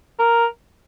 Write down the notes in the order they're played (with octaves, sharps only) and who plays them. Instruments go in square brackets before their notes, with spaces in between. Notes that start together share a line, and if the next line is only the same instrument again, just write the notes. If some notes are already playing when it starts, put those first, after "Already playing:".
[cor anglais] A#4